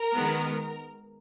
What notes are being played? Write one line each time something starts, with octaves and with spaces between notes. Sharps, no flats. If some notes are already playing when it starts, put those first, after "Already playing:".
Already playing: A#4 A#5
D#3 G#3 B3